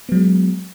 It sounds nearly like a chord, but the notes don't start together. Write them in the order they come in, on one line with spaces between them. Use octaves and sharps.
B3 F#3 G#3